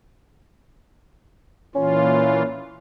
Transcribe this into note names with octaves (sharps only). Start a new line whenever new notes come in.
A#2 E3 C#4 F4